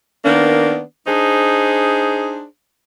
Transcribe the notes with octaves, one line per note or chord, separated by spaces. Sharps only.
D#3 A#3 B3 D4
D4 D#4 G#4 C5